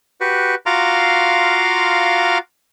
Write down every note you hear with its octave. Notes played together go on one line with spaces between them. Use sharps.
F#4 G4 B4
F4 F#4 F5 A#5 C6 D6